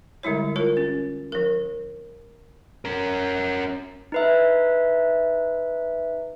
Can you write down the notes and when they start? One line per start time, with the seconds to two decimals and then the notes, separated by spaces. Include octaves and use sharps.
0.23 D3 G3 G#3 E4 C#5
0.56 F4 A#4 C#5
0.77 C#4
1.32 F3 A#4
2.85 C#4 A#4
4.12 D#4 B4 E5